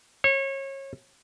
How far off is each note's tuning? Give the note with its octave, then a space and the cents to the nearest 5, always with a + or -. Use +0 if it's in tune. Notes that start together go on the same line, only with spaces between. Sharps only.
C#5 -30